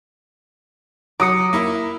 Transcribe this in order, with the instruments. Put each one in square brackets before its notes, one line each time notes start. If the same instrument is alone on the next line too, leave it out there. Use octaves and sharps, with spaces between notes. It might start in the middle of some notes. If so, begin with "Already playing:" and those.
[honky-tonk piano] F#3 [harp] D6 D#6 C#7
[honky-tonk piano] A#3 E4